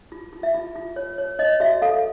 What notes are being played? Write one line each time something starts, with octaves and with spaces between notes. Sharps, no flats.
F4
F4
E5
F4
F4
C#5
C#5
C#5 D#5
F#4 E5
A4 F5